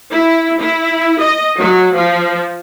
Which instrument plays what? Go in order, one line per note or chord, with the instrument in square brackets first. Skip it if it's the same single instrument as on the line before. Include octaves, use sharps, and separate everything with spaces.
[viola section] E4
E4
D#5
F#3
F3